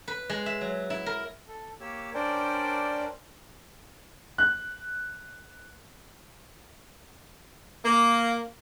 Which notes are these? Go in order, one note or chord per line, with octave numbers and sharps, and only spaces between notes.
B4
G#3
E5
F#3
E4
A#4
A4
A#3 G4 C#5 E6
C#4 D4 A#4 C5 D5 G5
F#6
A#3